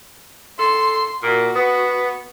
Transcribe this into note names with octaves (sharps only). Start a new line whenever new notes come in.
A4 C6
A#2 F#4
B3